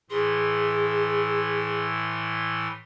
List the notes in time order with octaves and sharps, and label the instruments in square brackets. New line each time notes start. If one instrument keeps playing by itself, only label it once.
[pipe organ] A2 E3 C6 [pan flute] G#4